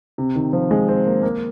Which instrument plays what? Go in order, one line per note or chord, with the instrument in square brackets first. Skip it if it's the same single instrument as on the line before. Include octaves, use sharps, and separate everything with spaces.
[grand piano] C3
D#3
F3
G#3
C4
A#3
A#3